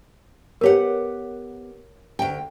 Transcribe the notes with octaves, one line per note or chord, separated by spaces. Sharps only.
B3 G4 A#4 C#5 F#5
D2 G5